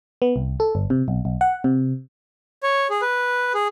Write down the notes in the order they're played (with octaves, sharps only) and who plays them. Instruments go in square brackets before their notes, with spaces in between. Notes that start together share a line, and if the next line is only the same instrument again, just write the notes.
[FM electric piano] B3
C2
A4
G1
C3
B1
B1
F#5
C3
[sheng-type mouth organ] C#5
G#4
B4
G#4